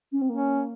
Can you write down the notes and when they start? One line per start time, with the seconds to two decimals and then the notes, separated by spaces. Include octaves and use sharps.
0.12 C#4
0.21 C4
0.29 A#3 C#4